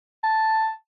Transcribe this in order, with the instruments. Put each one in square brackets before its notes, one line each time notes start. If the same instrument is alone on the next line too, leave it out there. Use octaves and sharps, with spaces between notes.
[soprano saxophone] A5